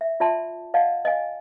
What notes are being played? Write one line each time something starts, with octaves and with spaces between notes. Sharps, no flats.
E5
F4 D5 E5 A5 C6
D5 D#5 F5 F#5 A5
D#5 F5 G#5